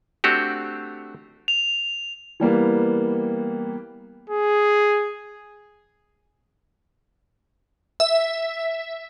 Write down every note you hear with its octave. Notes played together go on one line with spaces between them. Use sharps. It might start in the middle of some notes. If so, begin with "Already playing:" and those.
A3 C4 D4 F#4 G4
F7
E3 G3 A#3 B3
G#4
E5